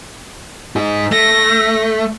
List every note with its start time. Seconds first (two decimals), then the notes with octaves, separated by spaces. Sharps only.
0.76 D#4 G#4
1.12 A3 A#6